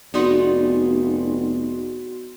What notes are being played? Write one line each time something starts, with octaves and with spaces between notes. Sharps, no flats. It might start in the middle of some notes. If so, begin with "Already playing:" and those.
F1 B3 D#4 F#4 G#4 D5 C6